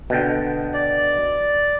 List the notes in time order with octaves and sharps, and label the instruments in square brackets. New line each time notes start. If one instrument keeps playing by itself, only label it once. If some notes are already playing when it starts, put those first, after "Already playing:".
[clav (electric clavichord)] B2 D3 G5
[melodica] D5